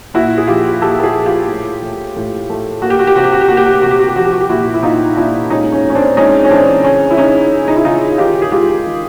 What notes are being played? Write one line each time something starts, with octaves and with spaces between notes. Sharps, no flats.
A#2 E4 F#4
G#4
F3 F4 G4
A#2 G4 A4
A4
F#4 G#4
F3
F4 G4
A2
A2
A2
A3
A#3 F#4
G4
F#4
G4
C3 F#4
G4
F#4
G4
A#3 F#4
G4
F#4
G4
C3 F#4
G4
F#4
G4
F3 F#4
G4
F#4
G4
A#2 E4 F#4
E4
A#2 D#4 F4
A#2 D4 E4
G#3 C#4 D#4
C#4
A2
C#4
C4 D4
G#3 C#4 D#4
C#4
E3 C4 D4
C#3 C#4
E4
C#3 C#4 D#4
C#3
D#4
E4
C#3 D#4 F4
D#3 F4 G4
G#4
G#3 F4 G4
D#3